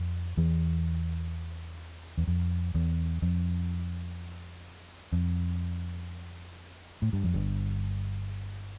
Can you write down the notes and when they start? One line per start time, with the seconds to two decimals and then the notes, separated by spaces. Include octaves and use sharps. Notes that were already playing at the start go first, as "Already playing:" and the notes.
Already playing: F2
0.37 E2 E3
2.18 E2
2.27 F2
2.75 E2
3.22 F2
5.13 F2
7.02 A2
7.13 G2
7.24 F2
7.34 G1 G2